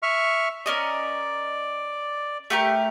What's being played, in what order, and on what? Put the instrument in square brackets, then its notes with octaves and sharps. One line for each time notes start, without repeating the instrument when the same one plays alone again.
[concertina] E5 C#6 F6
[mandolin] C#4 A#4 D#5 [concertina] D5
[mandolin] A3 G4 A#4